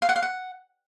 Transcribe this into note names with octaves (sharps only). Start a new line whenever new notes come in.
F5
F#5
F5
F#5